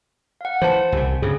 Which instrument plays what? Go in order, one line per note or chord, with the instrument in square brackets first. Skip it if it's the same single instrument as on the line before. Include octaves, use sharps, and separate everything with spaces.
[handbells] F5 F#5
[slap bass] E3 [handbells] C5 A5
[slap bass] C2 C3 [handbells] G#5
[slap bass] G2 C#3 [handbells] G#4